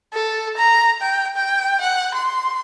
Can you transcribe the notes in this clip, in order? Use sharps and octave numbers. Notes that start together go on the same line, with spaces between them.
A4
A#5
G5
G5
F#5
C6